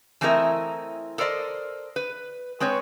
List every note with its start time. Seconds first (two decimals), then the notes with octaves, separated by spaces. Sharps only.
0.21 E3 A3 C4 E4 A#4 D#5
1.18 A4 A#4 C5 D5 D#5
1.96 B4
2.60 G#3 C4 B4 C#5